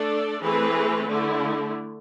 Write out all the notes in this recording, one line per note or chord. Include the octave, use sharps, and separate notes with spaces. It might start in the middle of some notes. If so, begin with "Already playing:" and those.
Already playing: A3 D4 A4 D5
E3 A3 C4 G#4 B4
D3 A3 E4